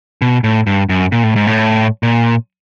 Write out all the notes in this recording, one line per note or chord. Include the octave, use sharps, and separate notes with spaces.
B2
A2
G2
F#2
A#2
A2
G#2
A2
A#2